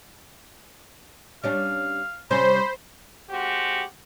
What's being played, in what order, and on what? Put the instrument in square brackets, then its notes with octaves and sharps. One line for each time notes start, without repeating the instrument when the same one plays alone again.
[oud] G3 C#4 D4 [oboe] F5
[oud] C3 G3 C#4 [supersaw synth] C5 [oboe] B5
[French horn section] G#3 C4 F#4 G4